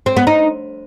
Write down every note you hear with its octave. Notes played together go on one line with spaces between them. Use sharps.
C4
B3
D#4